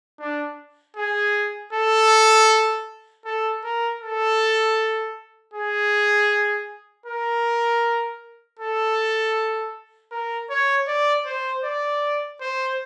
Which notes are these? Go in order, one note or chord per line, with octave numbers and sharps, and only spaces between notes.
D4
G#4
A4
A4
A#4
A4
G#4
A#4
A4
A#4
C#5
D5
C5
D5
C5